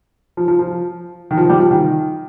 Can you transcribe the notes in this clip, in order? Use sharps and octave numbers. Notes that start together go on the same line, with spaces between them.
F3
F3
F3
D#3
F3
G3
F3
D#3